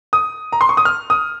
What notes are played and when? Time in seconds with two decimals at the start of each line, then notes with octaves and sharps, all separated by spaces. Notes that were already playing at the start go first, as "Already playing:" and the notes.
0.13 D#6
0.52 A#5
0.61 C6
0.69 C#6
0.77 D#6
0.85 F6
1.10 D#6